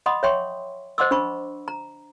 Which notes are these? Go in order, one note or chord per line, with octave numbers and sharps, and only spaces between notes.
D#5 F#5 B5 C6 D#6
C#5 E5 G5 C6 C#6
C5 D#5 F#5 C6 D6 E6
D4 C5 B5 C#6
A#5